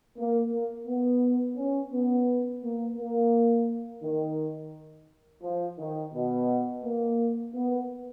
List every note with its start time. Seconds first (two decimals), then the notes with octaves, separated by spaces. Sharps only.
0.17 A#3
0.52 A#3
0.87 B3
1.56 C#4
1.92 B3
2.62 A#3
2.97 A#3
4.02 D#3
5.42 F3
5.78 D#3
6.13 B2
6.83 A#3
7.54 B3